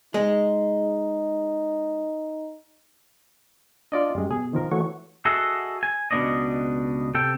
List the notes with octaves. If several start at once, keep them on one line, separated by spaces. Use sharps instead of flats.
G#3 D#4
D4 F4 D5 D#5
F#2 G3 G#3
B2 G#4
D#3 F3 A#4
E3 A3 F#4 C#5
F#4 G#4 A4 D#5 E5 F#5
G#5
C#2 B2 A#3 D4 D5 D#5
C3 A4 G5